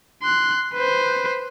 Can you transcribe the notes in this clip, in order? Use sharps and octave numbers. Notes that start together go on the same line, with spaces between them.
C6 F#6
B4 C5